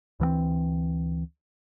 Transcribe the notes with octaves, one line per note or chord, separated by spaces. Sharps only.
D2 E3 F3 C4